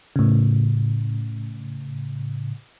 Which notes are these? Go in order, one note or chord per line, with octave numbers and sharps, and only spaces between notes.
A2 C#3